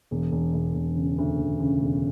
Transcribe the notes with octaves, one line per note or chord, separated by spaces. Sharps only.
E1
E1
E1
E1
C#3
D2
E1
C#3
E1